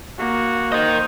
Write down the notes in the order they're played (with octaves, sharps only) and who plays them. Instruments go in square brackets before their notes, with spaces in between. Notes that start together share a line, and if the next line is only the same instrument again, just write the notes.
[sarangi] A#3 [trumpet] F#4
[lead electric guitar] A#4 D#5 [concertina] C5 D#6